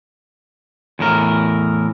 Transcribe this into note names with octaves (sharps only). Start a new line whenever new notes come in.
E2 A2 A#4